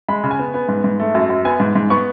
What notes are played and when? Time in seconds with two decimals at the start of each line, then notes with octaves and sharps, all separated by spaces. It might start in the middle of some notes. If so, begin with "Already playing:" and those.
0.08 G#3 B5
0.24 C#3
0.31 G#5
0.39 B3
0.54 B3
0.68 G#2
0.84 G#2
1.00 A3
1.15 F#2
1.30 F#2
1.45 B3 G#5
1.60 G#2
1.75 G#2
1.90 B3 C#6